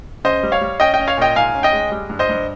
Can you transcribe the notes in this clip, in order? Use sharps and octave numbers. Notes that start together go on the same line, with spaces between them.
C#3 C5 D#5
G3
C#5 F5
G3
C#4 D#5 G5
D#5 G5
C#4
C#5 F5
A#2 D#5 G5
G#2 F5 G#5
C#4
D#5 G5
G#3
G3
G2
C5 D#5
G2